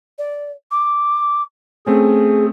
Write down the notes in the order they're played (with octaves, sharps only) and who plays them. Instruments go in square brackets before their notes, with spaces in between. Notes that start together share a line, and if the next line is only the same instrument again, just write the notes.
[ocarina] D5
D6
[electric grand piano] A3 C4 C#4 [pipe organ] G#4 [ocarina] G#5